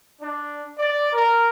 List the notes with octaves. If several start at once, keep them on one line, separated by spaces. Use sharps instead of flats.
D4
D5
A#4